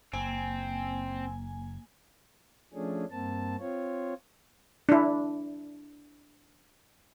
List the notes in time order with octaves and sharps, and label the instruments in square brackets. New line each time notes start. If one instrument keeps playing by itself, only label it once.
[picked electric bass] F#1 [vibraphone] A#3 [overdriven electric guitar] C4 [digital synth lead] G#5
[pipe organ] F3 A3 C#4 D4 G#4
G2 A#3 C4 A5
C4 F4 C#5
[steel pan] D4 E4